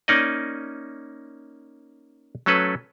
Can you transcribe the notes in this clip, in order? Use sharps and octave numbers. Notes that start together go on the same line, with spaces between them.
A#3 C#4 D#4 D5 D#5
F#3 A3 C#4 A4 B4